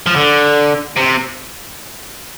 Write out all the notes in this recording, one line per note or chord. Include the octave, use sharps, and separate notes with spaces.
F3
D3
C3